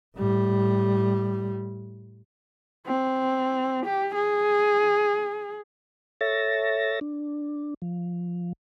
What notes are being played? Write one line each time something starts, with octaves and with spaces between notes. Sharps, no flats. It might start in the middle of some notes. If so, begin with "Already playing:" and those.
A2 G3
C4
G4
G#4
A4 C#5 E5 A6 A#6
D4
F3